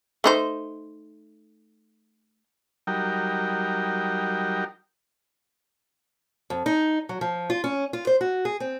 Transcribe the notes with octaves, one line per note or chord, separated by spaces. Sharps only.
A3 D#4 C5
F#3 G3 D#4 A#4 G5
F2
D#4
F#3
F3
F4
C#4
F4
C5
F#4
G#4
C4